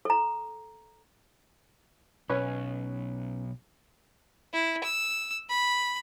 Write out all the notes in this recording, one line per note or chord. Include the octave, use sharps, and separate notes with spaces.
A4 A#5
B1 C#4 B4 C#5
E4
E6
B5